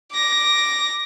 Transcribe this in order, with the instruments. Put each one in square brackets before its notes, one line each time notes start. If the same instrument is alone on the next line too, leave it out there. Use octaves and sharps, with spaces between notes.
[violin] D6 A#6